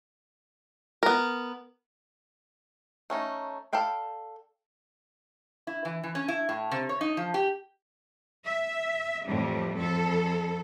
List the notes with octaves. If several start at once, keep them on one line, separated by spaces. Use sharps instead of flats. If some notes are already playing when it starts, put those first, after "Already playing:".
B3 A#4
A3 C#4 D#4
A4 D5 F5 G5 B5
E4
E3
E3
C#4
E4
A2
C3
C#5
D#4
F3
G4
E5
F2 A2 E3 G3
F2 A4